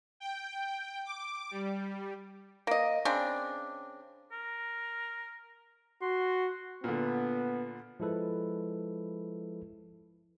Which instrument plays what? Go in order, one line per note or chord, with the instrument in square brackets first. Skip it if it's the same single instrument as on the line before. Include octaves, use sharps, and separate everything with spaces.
[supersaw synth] G5
D6
G3
[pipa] A#3 D#5
C#3 C4 D4
[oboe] A#4
[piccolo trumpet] F#4 [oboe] C6
[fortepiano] A#2 D3 [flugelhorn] B3
[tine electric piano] F3 G#3 E4 A4 B4